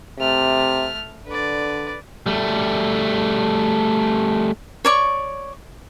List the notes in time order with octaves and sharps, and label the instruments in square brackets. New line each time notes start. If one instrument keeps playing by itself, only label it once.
[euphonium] C3 [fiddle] A3 F6
[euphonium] D3 [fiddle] B4 D5
[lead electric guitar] G3 A3
[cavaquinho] C#5 D5 C#6